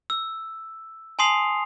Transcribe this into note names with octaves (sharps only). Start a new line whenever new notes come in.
E6
G#5 A5 C6 D#6 C7 F7